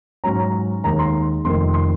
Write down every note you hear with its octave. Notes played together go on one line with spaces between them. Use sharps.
G#2 F#3 C#4 A#5
D#2 D#3 G#3 A#5
C6
F1 F2 C3 D#3 A#3 C6
C6